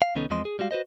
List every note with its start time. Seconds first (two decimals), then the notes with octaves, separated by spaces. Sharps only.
0.02 F5
0.15 C2 D#3 B3 C#4 D#4 A4
0.30 E2 F3 G#3 C4 D#5 C6
0.45 G#4
0.59 G3 G#3 F#4 F5
0.71 F#4 B4 C5 D#5